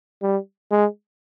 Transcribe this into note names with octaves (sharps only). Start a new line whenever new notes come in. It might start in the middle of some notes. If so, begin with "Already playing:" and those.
G3
G#3